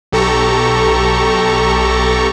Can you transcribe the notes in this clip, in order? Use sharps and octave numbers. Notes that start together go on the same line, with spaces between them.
B1 G4 A4 A#5 C#6